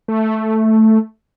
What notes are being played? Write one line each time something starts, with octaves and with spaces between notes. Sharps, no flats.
A3